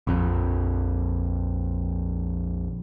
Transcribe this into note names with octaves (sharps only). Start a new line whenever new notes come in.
A#1 F2